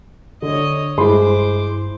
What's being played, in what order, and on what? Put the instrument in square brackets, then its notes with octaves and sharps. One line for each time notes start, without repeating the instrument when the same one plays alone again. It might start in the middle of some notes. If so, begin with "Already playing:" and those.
[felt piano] D3 [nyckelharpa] C#5 D#5
[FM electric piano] G2 E4 [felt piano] G#3 B5 C6 [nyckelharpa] C5 D6